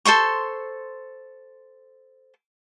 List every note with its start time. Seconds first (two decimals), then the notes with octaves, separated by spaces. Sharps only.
0.05 A4 C5 C6 C#6